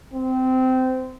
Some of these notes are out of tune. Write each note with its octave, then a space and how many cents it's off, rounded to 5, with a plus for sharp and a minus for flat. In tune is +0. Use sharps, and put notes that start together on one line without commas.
C4 -20